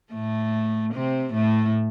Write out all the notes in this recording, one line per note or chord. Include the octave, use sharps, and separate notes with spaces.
A2 A3
C3 C4
A2 A3